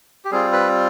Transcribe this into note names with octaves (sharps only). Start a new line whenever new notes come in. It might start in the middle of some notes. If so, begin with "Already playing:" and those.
G4
G3 C4 F4 G#4
B4